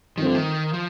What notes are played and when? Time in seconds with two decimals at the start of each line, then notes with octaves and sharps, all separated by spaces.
0.17 G2 D#3 F3 A3 C4
0.26 D3
0.35 D#3
0.73 F3